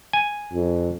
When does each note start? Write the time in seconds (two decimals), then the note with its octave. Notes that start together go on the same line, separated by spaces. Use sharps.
0.13 G#5
0.53 F2